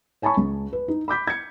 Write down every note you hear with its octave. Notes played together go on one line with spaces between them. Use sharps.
C#5 G#5 A5 B5 C#6
C#2
B4
D#4
B5 D6 G6 B6
G#6 C#7